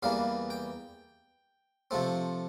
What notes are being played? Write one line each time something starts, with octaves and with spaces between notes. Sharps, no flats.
E2 E3 G3 A#3 F5
G5
C3 F3 A3 C4